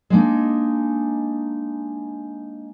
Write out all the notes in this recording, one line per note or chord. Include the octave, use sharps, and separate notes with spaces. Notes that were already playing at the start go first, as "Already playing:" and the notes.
G#3 A#3 D4 D#4